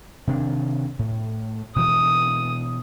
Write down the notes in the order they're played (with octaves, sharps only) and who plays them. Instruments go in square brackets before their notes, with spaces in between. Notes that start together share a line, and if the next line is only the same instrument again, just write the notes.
[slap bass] C3 D#3 D4
A2
[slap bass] B2 E3 [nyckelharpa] D#6